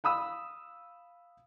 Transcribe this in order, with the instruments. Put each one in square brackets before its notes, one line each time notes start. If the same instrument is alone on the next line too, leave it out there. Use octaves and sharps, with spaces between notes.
[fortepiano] F5 B5 D#6 E6